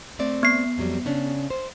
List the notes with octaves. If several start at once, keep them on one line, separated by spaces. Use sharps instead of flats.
A3 C4 D5
B3 C7
F2 F#3 G3
C#3 C#4 D4
C5